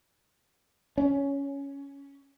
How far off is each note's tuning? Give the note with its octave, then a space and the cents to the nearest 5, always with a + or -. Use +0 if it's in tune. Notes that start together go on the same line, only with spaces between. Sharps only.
C#4 +10